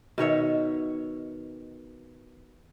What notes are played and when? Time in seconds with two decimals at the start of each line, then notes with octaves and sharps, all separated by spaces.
0.18 B2 D#3 C#5 E5